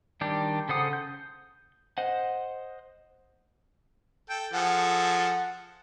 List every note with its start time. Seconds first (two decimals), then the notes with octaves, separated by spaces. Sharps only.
0.21 D#3 G3 D4 G4
0.69 C#3 A4 C5 F#5 D#6
0.93 G6
1.98 C5 D#5 F#5
4.30 A4 G5
4.53 F3 G#4 A4 F#5